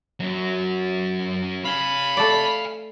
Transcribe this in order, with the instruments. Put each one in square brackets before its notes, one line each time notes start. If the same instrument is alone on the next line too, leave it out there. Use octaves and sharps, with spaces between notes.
[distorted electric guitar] F#2 F#3
[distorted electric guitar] F5 G#5 [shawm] B5
[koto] A3 D5